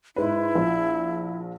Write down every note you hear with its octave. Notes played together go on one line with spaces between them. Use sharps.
G#2 G#3 E4 B4
A#1 F3